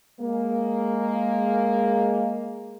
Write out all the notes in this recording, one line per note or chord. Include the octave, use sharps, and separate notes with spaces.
G#3 A#3